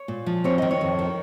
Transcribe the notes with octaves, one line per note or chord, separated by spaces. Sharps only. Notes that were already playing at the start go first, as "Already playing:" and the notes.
Already playing: C#5
A#2
F3
C4 C#5
D#3 D#5
C#5
F2
D#3